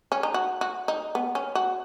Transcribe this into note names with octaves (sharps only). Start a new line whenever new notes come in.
C#4
D#4
F#4
F#4
D#4
B3
C#4
F#4